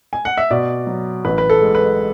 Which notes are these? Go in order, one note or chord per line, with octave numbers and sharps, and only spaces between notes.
G#5
F#5
E5
B2 D5
F#3
A1 B4
B4
A4
G#3
B4